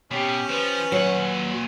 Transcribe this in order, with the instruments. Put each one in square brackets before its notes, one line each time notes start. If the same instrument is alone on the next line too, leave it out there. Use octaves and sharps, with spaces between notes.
[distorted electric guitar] B2 [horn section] C#4 [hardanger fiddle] G4
[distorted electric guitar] F3 [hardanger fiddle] B4
[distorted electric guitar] A#2 F#5 [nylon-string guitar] F#3